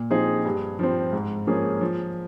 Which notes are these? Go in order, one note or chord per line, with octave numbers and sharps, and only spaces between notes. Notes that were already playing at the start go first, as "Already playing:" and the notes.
Already playing: A#2
F3 C4 D#4 G#4
G2
F3 C4
G#2
F3 A#3 C#4 G#4
F3